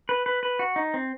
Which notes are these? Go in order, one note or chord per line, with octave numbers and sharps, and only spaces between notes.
B4
B4
B4
F#4
D#4
C4